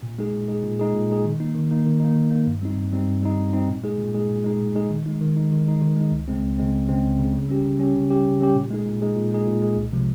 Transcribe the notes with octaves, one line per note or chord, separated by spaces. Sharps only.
A#2
G#3 D#4 G#4
A#2
G#3 D#4 G#4
A#2
G#3 D#4 G#4
A#2
G#3 D#4 G#4
D#3
A#3 D#4
D#3
A#3 D#4
D#3
A#3 D#4
D#3
A#3 D#4
G2
G3 C4 D#4
G2
G3 C4 D#4
G2
G3 C4 D#4
G2
G3 C4 D#4
A#2
G#3 D#4 G#4
A#2
G#3 D#4 G#4
A#2
G#3 D#4 G#4
A#2
G#3 D#4 G#4
D#3
G#3 D#4
D#3
G#3 D#4
D#3
G#3 D#4
D#3
G#3 D#4
C#2
C#3 G#3 C4
C#2
C#3 G#3 C4
C#2
C#3 G#3 C4
C#2
C#3 G#3 C4
C#3
G3 C#4 G4
C#3
G3 C#4 G4
C#3
G3 C#4 G4
C#3
G3 C#4 G4
A#2
G#3 D#4 G#4
A#2
G#3 D#4 G#4
A#2
G#3 D#4 G#4
A#2
G#3 D#4 G#4
C2
C3 F3 G#3